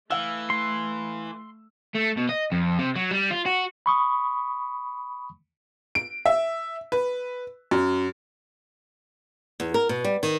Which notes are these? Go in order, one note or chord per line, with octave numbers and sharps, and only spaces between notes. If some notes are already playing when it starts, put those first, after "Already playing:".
E3 A3 F5 E6
C6
A3
B2
D#5
F2
C3
F#3
G3
F4
F#4
B5 C#6 D#6
D7
E5
B4
F#2
E2
A#4
B2
G3
D#3